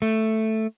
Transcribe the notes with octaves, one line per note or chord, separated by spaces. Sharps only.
A3